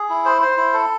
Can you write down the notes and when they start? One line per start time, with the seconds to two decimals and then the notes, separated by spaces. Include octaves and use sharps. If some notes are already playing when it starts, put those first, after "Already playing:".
Already playing: G#4
0.10 E4
0.25 C5
0.42 C5
0.57 E4
0.73 A4